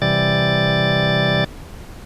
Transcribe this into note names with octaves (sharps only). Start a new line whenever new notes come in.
C3 E3 G3 D5 A6